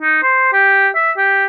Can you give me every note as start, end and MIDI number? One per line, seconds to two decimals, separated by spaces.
0.01 0.18 63
0.22 0.49 72
0.53 0.89 67
0.95 1.11 76
1.17 1.46 67